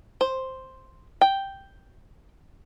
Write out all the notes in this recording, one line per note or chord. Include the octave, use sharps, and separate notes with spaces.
C5
G5